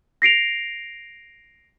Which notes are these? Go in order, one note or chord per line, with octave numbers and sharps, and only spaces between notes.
A#6 C7 D7 F7